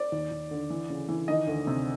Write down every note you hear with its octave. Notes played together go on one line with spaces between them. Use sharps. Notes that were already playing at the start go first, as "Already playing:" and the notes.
Already playing: D5
D#2
D#2
D3
E3
C#3
E3
D#3 D#5
D2
C3